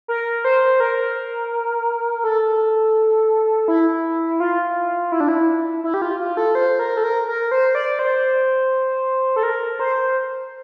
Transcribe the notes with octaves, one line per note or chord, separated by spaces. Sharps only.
A#4
C5
A#4
A4
E4
F4
E4
D4
E4
E4
G4
F4
F4
A4
C5
A#4
A4
A#4
A#4
C5
D5
C5
A4
A#4
C5